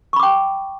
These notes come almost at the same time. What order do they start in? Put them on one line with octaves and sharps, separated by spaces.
C#6 B5 D6 G5